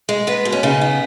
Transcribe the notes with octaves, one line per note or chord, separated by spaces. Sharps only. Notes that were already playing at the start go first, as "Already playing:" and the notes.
G#3
B3 B4
B2
C#4
C#3 D#4
B3